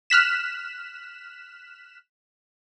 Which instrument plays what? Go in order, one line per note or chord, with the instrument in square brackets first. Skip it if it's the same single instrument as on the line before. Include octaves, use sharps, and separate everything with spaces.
[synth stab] F6 F#6 B6 E7